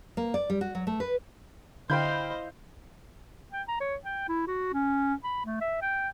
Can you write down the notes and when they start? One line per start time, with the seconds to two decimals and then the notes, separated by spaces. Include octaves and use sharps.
0.17 A#3
0.34 D5
0.50 G3
0.61 F#4
0.75 F#3
0.87 A3
1.00 B4
1.90 D3 E4 C5 D#5 F5 G5 B5 G6
3.53 G5
3.68 A#5
3.80 C#5
4.05 G5
4.28 E4
4.47 F#4
4.73 C#4
5.24 B5
5.46 A3
5.61 E5
5.82 G5